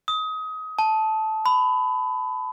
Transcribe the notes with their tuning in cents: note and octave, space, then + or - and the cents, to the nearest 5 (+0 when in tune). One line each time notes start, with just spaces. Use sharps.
D#6 +25
A5 -10
B5 +20